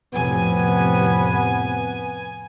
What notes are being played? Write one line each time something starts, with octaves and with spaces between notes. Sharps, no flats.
F2 A2 C3 B3 G#5